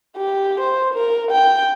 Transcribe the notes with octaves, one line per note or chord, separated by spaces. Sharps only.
G4
C5
A#4
G5